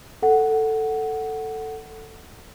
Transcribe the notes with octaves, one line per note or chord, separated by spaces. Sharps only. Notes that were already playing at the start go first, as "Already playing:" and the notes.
A4 F#5